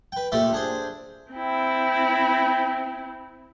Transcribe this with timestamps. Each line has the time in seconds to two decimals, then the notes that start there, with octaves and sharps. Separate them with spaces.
0.12 B4 G5
0.32 A#2 A3 G4 D5 E5 C6
0.53 D4 G#4 C5
1.32 C4 E4 G5